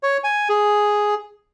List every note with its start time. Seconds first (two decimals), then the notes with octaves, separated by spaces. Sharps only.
0.03 C#5
0.24 G#5
0.49 G#4